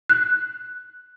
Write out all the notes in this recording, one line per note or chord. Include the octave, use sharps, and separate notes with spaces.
F#6